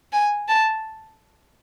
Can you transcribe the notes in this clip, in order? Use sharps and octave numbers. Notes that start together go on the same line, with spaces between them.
G#5
A5